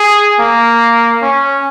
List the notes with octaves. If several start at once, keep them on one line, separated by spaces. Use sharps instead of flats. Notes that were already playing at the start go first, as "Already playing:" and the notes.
Already playing: G#4
A#3
C#4